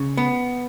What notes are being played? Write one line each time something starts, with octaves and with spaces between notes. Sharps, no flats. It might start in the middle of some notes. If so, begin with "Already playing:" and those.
Already playing: C#3
B3